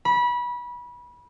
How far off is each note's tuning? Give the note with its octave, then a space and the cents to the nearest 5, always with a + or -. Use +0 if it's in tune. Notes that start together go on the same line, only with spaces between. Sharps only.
B5 -25